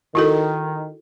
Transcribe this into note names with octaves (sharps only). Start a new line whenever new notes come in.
D#3 E4 F#4 A4